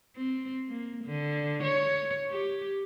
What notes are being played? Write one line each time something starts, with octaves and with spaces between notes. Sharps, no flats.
C4
A#3
D3
C#5
G4